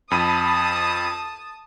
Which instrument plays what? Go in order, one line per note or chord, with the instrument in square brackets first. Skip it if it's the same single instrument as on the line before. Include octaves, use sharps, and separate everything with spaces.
[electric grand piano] F2 B5 D#7 [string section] A5 D#6